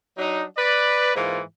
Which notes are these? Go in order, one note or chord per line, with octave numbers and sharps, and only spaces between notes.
F#3 D4 D#4
B4 D5
G#2 E3 A#3 F4